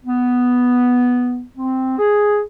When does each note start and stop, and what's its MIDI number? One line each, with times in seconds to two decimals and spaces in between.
0.04 1.42 59
1.57 1.95 60
1.98 2.42 68